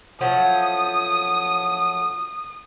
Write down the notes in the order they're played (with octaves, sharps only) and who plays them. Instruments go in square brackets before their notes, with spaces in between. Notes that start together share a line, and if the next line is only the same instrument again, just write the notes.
[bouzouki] F3 F#3 A3 [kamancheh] D#6